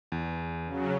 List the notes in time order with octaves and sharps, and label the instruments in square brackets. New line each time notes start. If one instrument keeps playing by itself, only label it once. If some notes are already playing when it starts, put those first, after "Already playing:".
[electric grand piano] E2
[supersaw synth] C#3 F#3